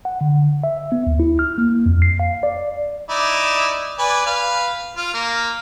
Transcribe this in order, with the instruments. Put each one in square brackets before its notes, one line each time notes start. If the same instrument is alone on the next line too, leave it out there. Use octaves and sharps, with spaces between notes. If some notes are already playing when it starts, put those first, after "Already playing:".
[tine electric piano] F#5
D3
E5
B3
D2
E4
F6
A#3
F2
C7
F5
D5
[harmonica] D#4 E4 D5
B4 D5 G#5
B4 F5
F4
A#3